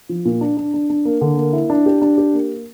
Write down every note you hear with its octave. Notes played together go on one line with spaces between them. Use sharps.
F3
A#2
D4
D4
D4
D4
A#3
D3
A#3
E4
D4
G4
D4
G4
A#3